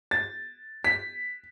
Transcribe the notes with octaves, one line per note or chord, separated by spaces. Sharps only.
A6
B6